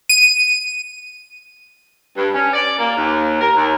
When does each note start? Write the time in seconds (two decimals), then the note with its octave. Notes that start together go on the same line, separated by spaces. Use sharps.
0.10 D#7
2.17 G2
2.34 C#4
2.53 D5
2.78 A#3
2.96 D#2
3.41 A#4
3.55 D#2